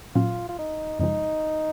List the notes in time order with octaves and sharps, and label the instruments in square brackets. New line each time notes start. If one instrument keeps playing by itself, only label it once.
[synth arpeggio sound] A#2 F#3 C#4 [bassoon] F4
[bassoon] F4
D#4
[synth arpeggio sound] F#2 C#3 F3 G#3 [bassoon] D#4